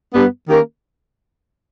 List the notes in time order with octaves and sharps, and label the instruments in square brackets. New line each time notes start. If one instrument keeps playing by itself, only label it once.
[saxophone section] G2 G3 B3
D#3 A#3 C#4 G4 A#4